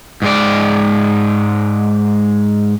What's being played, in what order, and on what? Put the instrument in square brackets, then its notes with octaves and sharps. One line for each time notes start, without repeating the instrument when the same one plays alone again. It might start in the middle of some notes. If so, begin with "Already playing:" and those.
[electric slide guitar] G#2 G#3 D5